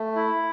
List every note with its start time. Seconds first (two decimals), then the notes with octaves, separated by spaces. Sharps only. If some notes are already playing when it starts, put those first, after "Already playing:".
Already playing: A3
0.16 E4